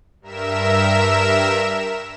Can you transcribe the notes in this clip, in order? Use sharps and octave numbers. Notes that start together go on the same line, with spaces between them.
G2 A#4 E5 E7